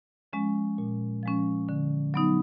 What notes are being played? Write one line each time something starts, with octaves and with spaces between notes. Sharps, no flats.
F3 G#3 C#4
A#2
F3 G#3 C#4
D3
F#3 B3 D#4